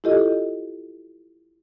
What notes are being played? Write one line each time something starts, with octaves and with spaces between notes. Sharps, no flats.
E4 F4 G4 A4 D#5